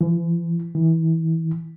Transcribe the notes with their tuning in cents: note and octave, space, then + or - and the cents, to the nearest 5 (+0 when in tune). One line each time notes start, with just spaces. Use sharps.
E3 +45
E3 -25